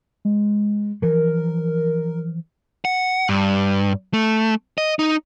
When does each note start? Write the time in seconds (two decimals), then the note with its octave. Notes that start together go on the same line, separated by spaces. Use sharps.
0.25 G#3
1.02 E3 F3 A#4
2.85 F#5
3.29 G2
4.13 A3
4.78 D#5
4.99 D#4